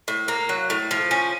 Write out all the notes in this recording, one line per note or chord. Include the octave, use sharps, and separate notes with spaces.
A2
A#3
F#3
A2
F3
C#4